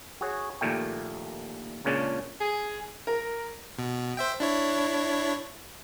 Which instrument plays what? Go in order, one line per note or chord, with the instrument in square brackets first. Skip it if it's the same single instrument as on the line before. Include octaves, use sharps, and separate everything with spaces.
[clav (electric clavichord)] F#4 G#4 C#5
A#1 D#2 A#2 A3 G5
C#2 A#2 C#3 C#4 D4 A5
[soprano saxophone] G#4
[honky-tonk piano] A#4
[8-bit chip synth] B2
C5 E5 G5
D4 E4 C#5